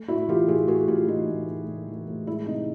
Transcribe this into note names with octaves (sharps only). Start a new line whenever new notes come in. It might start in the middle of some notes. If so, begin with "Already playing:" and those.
Already playing: A3
A2 E4 F#4
E3 F4 G4
A2 F#4 G#4
A3 F#4 G#4
A2 F4 G4
E3 D#4 F4
A2
A3
A2
E3
A2
G#3 E4
C3 D#4